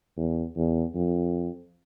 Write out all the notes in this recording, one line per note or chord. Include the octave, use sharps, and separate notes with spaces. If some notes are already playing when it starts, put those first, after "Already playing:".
E2
E2
F2